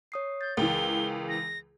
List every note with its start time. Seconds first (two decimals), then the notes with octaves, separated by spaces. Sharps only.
0.12 C#5 D#6 C7
0.41 G6 A6
0.57 C#2 E3 A#4 G5 G7
1.29 A#6